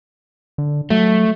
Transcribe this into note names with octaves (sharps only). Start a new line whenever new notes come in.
D3
F#3 A3